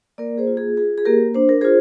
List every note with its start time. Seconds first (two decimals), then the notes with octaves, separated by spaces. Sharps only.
0.18 A#3 A#4 D5
0.37 G#4 C5
0.47 F4
0.57 G#4
0.77 F4 G#4
0.98 G#4
1.05 A#3 G4 A#4
1.34 D4 C5
1.49 A#4
1.61 F4 G#4 C5